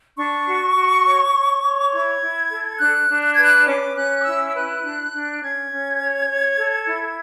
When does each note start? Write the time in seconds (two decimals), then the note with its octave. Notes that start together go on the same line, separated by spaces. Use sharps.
0.17 D4 C#6
0.47 F#4
0.75 F#4
1.05 C#5
1.34 C#5
1.63 C#5
1.92 E4 G#6
2.21 E4
2.50 A4
2.79 D4 F#6
3.09 D4
3.23 F#6
3.33 B4 G#6
3.44 F#6
3.66 C#4 D6
3.95 C#4 F#6
4.21 D6
4.24 E4 E6
4.48 E6
4.54 B4 F#6
4.83 D4
5.12 D4
5.42 C#4 G#6
5.71 C#4
6.00 C#5
6.29 C#5
6.58 A4
6.87 E4